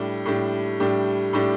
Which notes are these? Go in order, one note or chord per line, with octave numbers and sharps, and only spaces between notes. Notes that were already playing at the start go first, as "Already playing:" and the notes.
Already playing: A2 G3 D4 G4
A2 G3 D4 G4
A2 G3 D4 G4
A2 G3 D4 G4